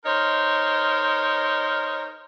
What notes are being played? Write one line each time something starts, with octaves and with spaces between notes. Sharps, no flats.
D#4 A#4 C5 C#5 D#5